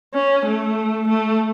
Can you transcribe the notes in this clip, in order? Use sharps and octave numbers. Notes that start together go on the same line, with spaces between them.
C#4
A3
A3